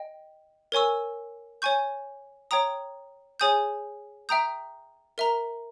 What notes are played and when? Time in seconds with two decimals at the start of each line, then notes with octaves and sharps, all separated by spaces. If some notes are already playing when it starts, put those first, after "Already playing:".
Already playing: D#5 G5
0.72 A#4 C#5 G#5 C#6 E6
1.62 C#5 G#5 C#6 G6
2.51 C#5 G5 A#5 D#6
3.40 G#4 C#5 G#5 D#6 G6
4.29 E5 G5 A#5 D#6 G6
5.18 A#4 E5 A#5